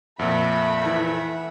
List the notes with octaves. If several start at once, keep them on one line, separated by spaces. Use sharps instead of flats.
F2 A#2 A3 E5 F#5 B5
E3